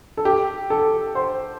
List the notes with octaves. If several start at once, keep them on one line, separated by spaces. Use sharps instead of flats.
A4
G4
A4
C5